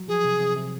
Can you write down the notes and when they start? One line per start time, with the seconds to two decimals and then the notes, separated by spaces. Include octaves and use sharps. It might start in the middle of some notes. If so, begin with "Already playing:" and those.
Already playing: F#3
0.08 F3 G#4
0.24 C3
0.41 C3
0.57 C3